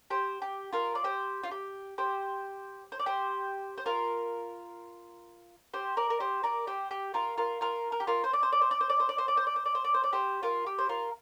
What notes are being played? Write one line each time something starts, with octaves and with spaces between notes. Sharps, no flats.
G4 C5
G4
F4 A#4
D5
G4 C5
F4
G4
G4 C5
C5
D5
G4 C5
C5
F4 A#4
G4 C5
A#4 D5
A#4
G4 C5
A#4 D5
G4 C5
G4
F4 A#4
F4 A#4
F4 A#4
A#4
G4
F4 A#4
C5
D5
C5
D5
C5
D5
C5
D5
C5
D5
C5
D5
C5
D5
C5
D5
C5
D5
C5
D5
G4 C5
F4 A#4
G4
C5
F4 A#4